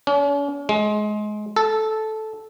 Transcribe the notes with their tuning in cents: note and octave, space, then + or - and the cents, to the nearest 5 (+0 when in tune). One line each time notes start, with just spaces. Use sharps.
C#4 +45
G#3 +25
A4 -10